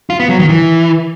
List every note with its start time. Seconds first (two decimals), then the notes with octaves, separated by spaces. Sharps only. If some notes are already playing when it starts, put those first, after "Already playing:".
0.10 F4
0.20 B3
0.29 F#3
0.39 D#3
0.49 E3